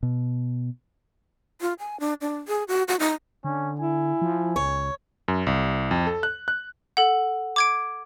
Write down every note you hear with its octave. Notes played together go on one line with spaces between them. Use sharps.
B2
F4
G#5
D4
D4
G#4
F#4
F#4
D#4
D3 C#4
E4 G#5
F3
C#2 C#5
F#2
C2
F2
A4
F#6
F#6
A4 F#5
D6 G#6 D7